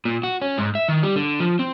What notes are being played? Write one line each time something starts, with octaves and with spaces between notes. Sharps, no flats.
A#2
F#4
C#4
G#2
E5
D#3
G3
D3
F3
C4